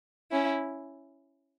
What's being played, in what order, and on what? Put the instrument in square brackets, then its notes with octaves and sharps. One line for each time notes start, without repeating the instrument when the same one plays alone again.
[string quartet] C#4 E4